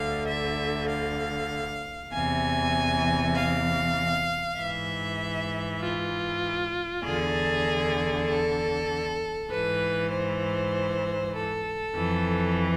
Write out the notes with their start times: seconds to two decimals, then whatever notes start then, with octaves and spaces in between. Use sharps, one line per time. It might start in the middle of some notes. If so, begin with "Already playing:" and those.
Already playing: D2 D3 F5
0.27 E5
0.89 F5
2.11 E2 C3 E3 G#5
3.35 F5
4.57 G#2 E3 E5
5.81 F4
7.03 E2 D3 G#4
8.26 A4
9.49 G#2 E3 B4
10.10 C5
11.34 A4
11.95 F2 E3